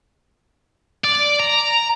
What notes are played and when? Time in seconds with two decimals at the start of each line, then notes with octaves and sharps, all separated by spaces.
1.04 D5
1.39 A#5